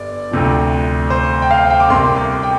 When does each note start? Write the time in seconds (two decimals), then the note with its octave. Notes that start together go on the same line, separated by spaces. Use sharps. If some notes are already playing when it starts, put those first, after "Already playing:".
Already playing: G1 D5
0.31 D2 C3 F3
1.10 C5
1.42 G5
1.51 F5
1.70 G5
1.80 D6
1.90 C2 C3 A#3 C6
2.16 D6
2.43 G5